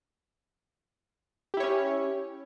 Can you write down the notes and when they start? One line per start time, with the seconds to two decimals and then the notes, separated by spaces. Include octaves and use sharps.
1.54 G4
1.57 E4
1.60 C#5
1.63 C#4